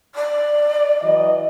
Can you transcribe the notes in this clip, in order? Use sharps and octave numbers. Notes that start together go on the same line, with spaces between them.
D5
E3 F#3 D#5